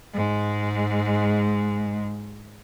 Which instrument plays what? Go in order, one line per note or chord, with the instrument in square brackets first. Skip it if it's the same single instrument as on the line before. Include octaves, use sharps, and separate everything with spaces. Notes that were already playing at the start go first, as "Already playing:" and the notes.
[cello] G#2 G#3